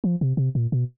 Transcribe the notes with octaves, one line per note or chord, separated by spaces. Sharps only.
F3
C3
C3
A#2
B2